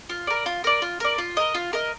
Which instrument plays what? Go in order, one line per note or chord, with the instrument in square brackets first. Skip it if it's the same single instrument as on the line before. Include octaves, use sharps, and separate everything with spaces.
[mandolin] F4
A#4 D5
F4
A#4 D5
F4
A#4 D5
F4
A#4 D#5
F4
A#4 D#5